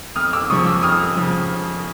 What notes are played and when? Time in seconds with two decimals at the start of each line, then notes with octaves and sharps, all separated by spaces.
0.16 F2 D#6 F6
0.33 D6 E6
0.50 C#3 F3 C#6 D#6
0.66 D6 E6
0.83 F2 D#6 F6
1.17 C#3 F3